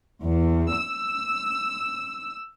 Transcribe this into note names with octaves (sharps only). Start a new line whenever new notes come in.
E2
E6